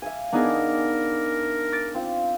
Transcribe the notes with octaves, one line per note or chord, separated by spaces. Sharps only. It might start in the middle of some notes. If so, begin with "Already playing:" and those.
E5 F5 G#5
B3 D4 D#4 G#4 A#4 D5
D6 A6 D7
C4 F4